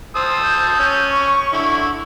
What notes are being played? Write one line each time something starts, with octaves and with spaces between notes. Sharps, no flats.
C5 A5 D#6 E6
G6
C#4
C#6
D3 E4